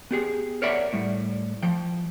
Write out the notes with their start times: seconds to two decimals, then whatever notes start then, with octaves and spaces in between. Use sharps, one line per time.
0.11 B3 G4 G#4
0.62 A#4 C#5 D5 E5 F#5 B5
0.93 A2 G3
1.63 F3 G5